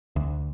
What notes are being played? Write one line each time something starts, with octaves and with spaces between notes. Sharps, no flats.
D2